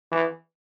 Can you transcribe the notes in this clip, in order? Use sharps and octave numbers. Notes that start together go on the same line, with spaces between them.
E3